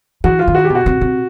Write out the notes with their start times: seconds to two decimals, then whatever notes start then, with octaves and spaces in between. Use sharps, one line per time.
0.24 E3 F#4
0.39 F4
0.48 D#3
0.55 F#4
0.65 G4
0.70 B2
0.75 F#4
0.86 C3
1.01 C3